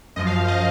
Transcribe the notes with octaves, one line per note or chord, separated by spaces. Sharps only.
F#2 F3 D#5
F5
D#5